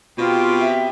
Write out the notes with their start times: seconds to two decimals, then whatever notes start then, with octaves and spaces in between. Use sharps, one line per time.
0.18 B2 C4 F4 G4
0.60 E5